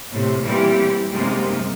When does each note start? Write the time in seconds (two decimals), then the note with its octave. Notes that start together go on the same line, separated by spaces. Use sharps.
0.10 A2 C3
0.43 A#2 E3 G3 C4 E4 G4
1.11 F#2 C3 G3 G#3 A#3 D#4